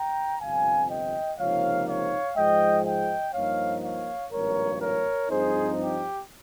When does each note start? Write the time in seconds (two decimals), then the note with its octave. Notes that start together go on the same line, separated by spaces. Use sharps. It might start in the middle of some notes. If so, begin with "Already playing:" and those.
Already playing: G5 A#5
0.41 G1 F2 C3 F5 G#5
0.91 D#5 G5
1.39 C#2 C3 F3 A#3 D#4 C#5 F5
1.88 C#5 F5
2.37 G#2 F3 G#3 D#5 G5
2.85 D#5 G5
3.34 G2 F3 A#3 D#4 C#5 F5
3.83 C#5 F5
4.32 G#1 G2 F3 A#3 A#4 C#5
4.81 A#4 C#5
5.29 G2 F3 C4 D#4 G#4 C5
5.79 G4